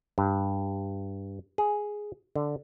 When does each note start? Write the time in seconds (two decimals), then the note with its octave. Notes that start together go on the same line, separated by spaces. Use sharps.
0.18 G2
1.58 G#4
2.36 D3